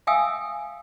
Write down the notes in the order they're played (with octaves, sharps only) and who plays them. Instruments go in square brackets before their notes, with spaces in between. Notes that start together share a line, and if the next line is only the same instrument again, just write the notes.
[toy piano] E5 F5 G5 G#5 D#6 E6